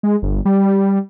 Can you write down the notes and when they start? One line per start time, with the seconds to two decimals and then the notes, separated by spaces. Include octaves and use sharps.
0.03 G#3
0.22 G1
0.45 G3